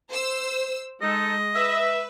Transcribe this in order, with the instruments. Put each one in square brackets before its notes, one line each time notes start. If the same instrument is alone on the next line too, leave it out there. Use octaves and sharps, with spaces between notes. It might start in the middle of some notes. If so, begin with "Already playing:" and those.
[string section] C5 E6
[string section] G#3 [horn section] D#4 A4 [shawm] D#5
[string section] B4 [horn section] E5